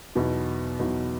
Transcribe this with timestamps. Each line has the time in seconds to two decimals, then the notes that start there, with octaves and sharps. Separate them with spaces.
0.15 E2 B2 F#3 B3 D#4
0.79 E2 B2 F#3 B3 D#4